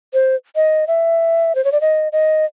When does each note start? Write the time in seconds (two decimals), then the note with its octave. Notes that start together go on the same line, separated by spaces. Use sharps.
0.13 C5
0.56 D#5
0.87 E5
1.55 C5
1.65 C#5
1.72 D5
1.81 D#5
2.12 D#5